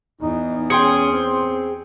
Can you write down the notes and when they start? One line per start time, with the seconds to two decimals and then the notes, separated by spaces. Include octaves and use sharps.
0.21 E2 D#4
0.70 C#4 G#4 G5 C6 C#7
1.12 C4